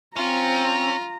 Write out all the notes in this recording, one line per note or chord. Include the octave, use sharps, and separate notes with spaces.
C4 C#4 F4 A#5